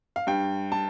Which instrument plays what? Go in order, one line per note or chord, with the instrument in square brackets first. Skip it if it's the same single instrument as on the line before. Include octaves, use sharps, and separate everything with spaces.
[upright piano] F5
G2 G5
A5